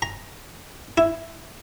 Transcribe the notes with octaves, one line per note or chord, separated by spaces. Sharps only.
A#5
E4